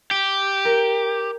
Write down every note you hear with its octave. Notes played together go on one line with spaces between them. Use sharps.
G4
A#4